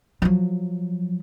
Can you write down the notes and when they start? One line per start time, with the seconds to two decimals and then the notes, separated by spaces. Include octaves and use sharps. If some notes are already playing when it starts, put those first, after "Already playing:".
0.22 F3 F#3